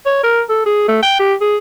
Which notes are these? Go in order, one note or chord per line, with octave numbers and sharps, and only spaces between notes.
C#5
A#4
A4
G#4
A3
G5
G4
G#4